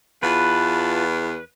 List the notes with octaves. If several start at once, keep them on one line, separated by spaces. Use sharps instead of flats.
E2 F4 B4 A5